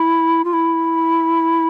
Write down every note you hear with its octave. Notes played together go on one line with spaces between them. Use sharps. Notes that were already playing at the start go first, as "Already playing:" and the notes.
Already playing: E4
F4
E4